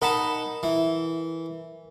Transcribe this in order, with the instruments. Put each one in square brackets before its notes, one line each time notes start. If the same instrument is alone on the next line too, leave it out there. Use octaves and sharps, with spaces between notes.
[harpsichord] D#4 F#5 A5 [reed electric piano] A#4 B5
[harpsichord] E3